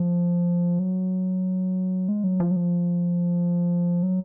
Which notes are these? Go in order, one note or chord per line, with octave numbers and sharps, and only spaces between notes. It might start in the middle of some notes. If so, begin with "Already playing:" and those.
Already playing: F3
F#3
G#3
F#3
F3
F#3
F3
F#3